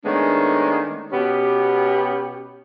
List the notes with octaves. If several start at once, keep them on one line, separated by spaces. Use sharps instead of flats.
D#3 G#3 A3 B3 C#4 D4
B2 B3 C#4 G4